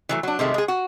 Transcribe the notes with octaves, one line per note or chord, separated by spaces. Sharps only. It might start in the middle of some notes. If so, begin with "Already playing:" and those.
E3 F#3 A3
F#3 D4
C3 D#3 G#3 A3
G#3 G#4
F#4